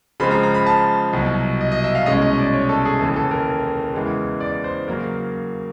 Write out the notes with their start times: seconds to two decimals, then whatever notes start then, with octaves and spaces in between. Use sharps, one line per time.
0.20 C#3 F3 G#3 C4 B5
0.31 A#5
0.43 A#5
0.54 B5
0.66 A5
1.13 C2 B2 F#3
1.61 D#5
1.72 D#5
1.84 E5
1.95 F5
2.06 C2 B2 G#3 C#4 D#5
2.22 D#5
2.38 D5
2.53 C#5
2.69 A4
2.85 G#4
3.01 D#2 C#3 E3 A4
3.16 A4
3.31 A#4
3.94 E2 C#3 E3 G#3
4.40 D5
4.64 C5
4.87 C#3 F#3 A#3 A#4